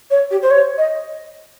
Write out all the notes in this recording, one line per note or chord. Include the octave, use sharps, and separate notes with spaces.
C#5
G4
C5
C#5
D#5